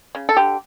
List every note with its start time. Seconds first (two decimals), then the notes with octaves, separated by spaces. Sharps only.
0.15 C#3
0.29 A4
0.36 D3 G4